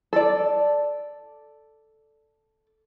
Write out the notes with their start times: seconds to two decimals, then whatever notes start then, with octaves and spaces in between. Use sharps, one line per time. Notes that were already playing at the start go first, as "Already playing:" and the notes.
0.13 A4 D5